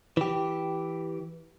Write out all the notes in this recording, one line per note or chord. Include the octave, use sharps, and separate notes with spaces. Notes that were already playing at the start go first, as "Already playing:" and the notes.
E3 G4